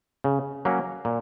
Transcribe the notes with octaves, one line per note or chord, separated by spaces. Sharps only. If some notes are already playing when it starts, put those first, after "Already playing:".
C#3
F#3 A#3 C#4
A#2